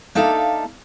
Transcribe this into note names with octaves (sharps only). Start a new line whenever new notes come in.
A#3 D4 D#4 A4 E5 F5